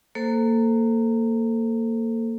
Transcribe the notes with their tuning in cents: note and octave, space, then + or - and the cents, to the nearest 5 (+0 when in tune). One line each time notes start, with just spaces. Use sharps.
A#3 -20 A4 +0 C5 +0